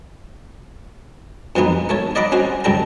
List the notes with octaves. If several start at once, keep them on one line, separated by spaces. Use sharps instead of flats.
F2 E3 F#3 B3 D#4
A3 A4 C#5
D5 D#5 F#5 A#5 B5 D6
C#4 F#4 C5
C2 F#2 A4 G5 A#5